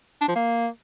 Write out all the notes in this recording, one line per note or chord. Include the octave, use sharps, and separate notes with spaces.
D4
F3
A#3